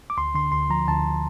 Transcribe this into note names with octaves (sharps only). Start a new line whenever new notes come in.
D6
D2 C6
D3 C6
D2 C6
F3 A#5
D2 A5